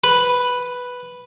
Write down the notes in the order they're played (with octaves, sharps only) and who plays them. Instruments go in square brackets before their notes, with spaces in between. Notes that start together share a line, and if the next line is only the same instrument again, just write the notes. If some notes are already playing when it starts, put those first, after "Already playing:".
[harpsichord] B4